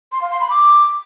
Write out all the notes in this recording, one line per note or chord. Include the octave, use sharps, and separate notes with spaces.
C6
F5
C6
B5
D6